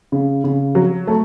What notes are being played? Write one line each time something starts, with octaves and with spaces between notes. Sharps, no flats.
C#3
C#3
F#3
A3